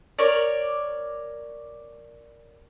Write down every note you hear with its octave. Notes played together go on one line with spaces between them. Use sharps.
A#4 C#5 D5